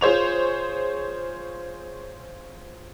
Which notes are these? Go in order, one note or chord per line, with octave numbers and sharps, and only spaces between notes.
F4 G#4 C5 C#5 F7